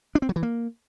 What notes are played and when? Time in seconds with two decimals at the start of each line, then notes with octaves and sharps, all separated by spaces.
0.15 D4
0.22 C4
0.29 F#3
0.36 E3
0.43 A#3